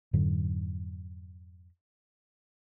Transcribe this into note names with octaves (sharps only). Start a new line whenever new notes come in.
F2 G#2 D3 F#3